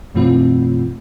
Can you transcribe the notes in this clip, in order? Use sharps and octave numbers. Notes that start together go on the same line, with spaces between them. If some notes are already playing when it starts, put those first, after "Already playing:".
F#2 B2 E3 A3 C4 F4